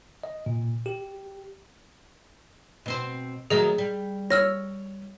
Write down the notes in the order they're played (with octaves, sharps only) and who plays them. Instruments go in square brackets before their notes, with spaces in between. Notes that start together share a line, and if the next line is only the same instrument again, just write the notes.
[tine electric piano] D#5
A#2
G4
[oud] B2 C4 C5
[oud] D#3 F#3 A3 [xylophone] G#4 D#5
[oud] G3
[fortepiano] C#5 [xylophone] E6 F6 A#6